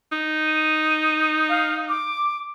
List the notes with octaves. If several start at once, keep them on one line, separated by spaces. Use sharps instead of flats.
D#4
D#7
F5
D6